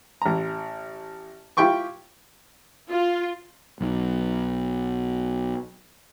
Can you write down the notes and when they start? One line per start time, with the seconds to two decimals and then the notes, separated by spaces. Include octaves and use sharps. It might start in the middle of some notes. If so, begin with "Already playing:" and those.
0.22 A1 A#5
1.57 E4 F4 G4 G5 C#6 D6
2.90 F4
3.81 B1 B2